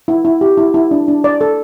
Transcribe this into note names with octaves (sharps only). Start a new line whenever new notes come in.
E4
E4
G4
E4
E4
D4
D4
D5
A4